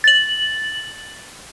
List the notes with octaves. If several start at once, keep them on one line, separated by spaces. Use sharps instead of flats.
A6 F#7